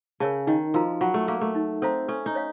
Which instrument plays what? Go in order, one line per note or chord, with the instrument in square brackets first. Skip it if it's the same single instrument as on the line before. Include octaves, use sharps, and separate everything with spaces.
[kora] C#3 [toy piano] A#4 C#5 A5
[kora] D#3 [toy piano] D#4
[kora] F3 [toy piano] F#4 A#4 F5 A#5
[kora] F#3 [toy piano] F4
[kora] A3
[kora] A#3 [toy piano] A#4 F5
[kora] A3
[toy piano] D#4
[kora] C4 [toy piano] A4 C5 F5 A#5
[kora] C#4 [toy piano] A4
[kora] D#4
[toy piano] C#5 F5